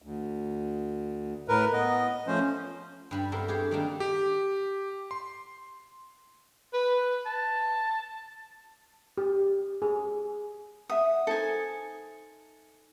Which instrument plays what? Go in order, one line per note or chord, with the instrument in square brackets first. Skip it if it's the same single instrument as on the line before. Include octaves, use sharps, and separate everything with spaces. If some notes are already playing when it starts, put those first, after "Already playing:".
[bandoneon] D2
A2 A#4 B4
B3 D#5
F3 A3 C#4 C5
[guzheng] G2 G3 B5
B3 C4 E4 G4 A4 A#4
G4 G#4 C5 C#5
D#3 G3 A3 A#3 D4 D#4
[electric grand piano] G4
C6
[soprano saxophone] B4
A5
[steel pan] G4
G#4
[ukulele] E5 F#5 [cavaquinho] D#6
[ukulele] D#4 C5 [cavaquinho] A4 G#5